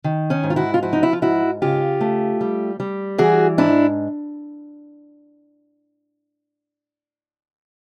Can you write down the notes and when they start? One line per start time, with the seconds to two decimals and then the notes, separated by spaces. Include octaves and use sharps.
0.04 D#3
0.30 C#4 D#4
0.43 G#2
0.50 F4
0.56 E4 F#4
0.74 F4
0.83 F3 E4 F#4
0.93 D#4
1.03 E4
1.13 F4
1.22 G#2 E4 F#4
1.62 C#3 F4 G4
2.01 A3
2.41 G3
2.80 G3
3.18 E3 F#4 G#4
3.58 G#2 D4 E4